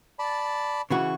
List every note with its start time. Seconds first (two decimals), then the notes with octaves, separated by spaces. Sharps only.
0.19 D5 A5 B5
0.90 C#3 E3 F#4 C#6